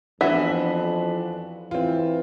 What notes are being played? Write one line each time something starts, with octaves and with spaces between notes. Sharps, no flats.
F2 E3 B3 D4 F#4 E5 F#5
E3 C4 F4